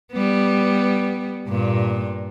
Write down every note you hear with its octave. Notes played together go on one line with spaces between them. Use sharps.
G3 B3
G2 A#2